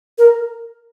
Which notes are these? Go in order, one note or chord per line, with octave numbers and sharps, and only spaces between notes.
A#4